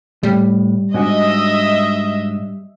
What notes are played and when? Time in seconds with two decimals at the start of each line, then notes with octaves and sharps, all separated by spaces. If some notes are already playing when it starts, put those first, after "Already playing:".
0.23 A2 G3
0.94 G#2 D4 F#4 D#5 E5